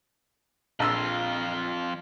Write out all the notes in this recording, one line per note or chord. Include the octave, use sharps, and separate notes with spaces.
A#1 F2 F4 E6